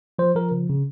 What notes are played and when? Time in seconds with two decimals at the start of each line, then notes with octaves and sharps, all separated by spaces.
0.19 F3 C5
0.35 F3 A#4
0.51 C#3
0.69 C#3